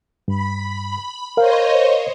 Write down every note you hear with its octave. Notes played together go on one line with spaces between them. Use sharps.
G2 B5
A#4 C5 C#5 D#5 F5